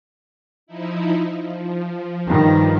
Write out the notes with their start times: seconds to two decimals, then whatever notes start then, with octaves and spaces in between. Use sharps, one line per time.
0.67 F3 D#4 E4
1.40 F3
2.26 G2 D#3